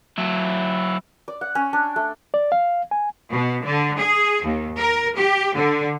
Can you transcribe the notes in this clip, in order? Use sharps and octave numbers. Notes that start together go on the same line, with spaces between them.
F#3 E4
D5
F#5
C#4
D4
A3
D5
F5
G#5
B2
D3
G#4
D#2
A#4
G4
D3